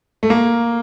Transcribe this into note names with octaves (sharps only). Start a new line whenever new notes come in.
A3
A#3